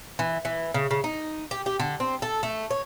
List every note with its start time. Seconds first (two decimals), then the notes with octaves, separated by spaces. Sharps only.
0.19 E3
0.45 E3
0.74 C#3
0.91 C#3
1.04 D#4
1.51 G4
1.66 G4
1.80 D3
2.00 C4
2.22 A4
2.43 A3
2.71 C#5